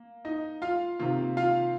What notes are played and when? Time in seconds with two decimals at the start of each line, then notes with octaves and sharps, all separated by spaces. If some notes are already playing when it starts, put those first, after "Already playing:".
Already playing: A#3
0.25 D#4 D#5
0.62 F4 F5
0.99 C3 D#3 A#3 F4
1.37 F4 F5